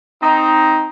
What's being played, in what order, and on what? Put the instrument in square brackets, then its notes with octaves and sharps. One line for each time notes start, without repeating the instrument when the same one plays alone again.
[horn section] C4 D#4